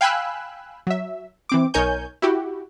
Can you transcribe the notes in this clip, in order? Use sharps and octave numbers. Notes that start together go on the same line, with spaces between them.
F5 G5 G#5 B5 E6 F#6
F#3 E5
E3 C4 D6
B1 D#4 A#4 C#5 G#5 G6
E4 F#4 G4